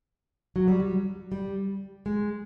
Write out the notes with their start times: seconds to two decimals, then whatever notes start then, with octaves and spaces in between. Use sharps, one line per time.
0.56 F#3
0.68 G3
0.80 F#3
1.32 G3
2.06 G#3